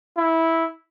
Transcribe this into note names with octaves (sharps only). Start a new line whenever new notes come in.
E4